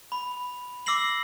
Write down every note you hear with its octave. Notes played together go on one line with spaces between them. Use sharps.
B5
D6 E6 A#6 C7 F#7